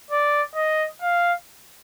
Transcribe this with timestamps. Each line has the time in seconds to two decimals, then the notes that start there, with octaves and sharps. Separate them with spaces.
0.11 D5
0.55 D#5
1.01 F5